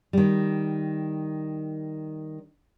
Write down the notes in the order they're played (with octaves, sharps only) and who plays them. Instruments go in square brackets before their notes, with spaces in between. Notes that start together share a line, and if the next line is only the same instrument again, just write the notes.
[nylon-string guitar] D#3 G3